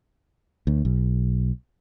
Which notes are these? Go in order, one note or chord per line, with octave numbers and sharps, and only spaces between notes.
D2
B1